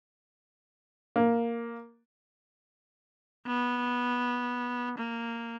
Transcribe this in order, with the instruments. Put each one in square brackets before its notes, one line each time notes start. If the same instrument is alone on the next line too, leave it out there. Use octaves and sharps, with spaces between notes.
[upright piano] A#3
[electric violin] B3
A#3